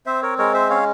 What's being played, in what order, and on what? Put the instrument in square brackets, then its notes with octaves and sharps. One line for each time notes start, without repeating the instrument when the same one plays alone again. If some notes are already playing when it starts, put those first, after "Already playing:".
[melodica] C4 C5 E5
A#4 C#5
G#3 A#4 C#5
C5 E5
C#4 C#5 F5